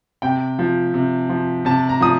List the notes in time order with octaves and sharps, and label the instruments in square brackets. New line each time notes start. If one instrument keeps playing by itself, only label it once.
[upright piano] C3 G5
F3
C3
F3
C3 A5
A#5
F3 D#6